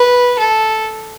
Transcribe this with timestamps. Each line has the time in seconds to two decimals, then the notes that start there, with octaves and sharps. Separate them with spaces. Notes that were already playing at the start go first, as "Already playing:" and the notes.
Already playing: B4
0.39 A4